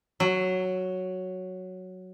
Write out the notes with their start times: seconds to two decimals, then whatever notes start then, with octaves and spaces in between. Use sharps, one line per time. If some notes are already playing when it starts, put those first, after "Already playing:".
0.20 F#3